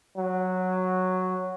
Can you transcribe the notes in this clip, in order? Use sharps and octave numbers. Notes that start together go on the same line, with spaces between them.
F#3